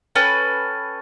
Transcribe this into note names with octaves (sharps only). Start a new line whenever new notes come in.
C#4 A4 B4 G5